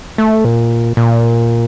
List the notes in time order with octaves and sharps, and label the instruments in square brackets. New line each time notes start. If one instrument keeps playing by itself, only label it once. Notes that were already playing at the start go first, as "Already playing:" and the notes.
[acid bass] A3
A#2
A#2